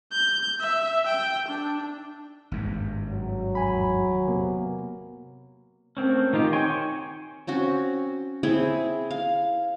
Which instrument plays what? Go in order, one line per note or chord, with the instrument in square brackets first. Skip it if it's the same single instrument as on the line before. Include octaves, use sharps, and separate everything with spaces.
[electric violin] G6
E5
G5
D4
[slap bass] G#1 G2
[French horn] F#3
[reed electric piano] E2 G#5 B5
C3 A#3 B3
[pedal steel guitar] A3 A#3 C4 C#4
D#3 D#4 F4 G4
C#5 G5 G#5 C6 C#6
F#4
[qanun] C4 C#4 F#4
C4 E4 G#4 C#5
F5